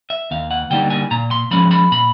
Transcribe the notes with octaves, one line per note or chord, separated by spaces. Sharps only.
E5
D#2 F5
F#5
D3 G3 A#3 D#4 G5
G#5
A#2 A#5
C6
F3 G#3 C#4 B5
B5
A#2 B5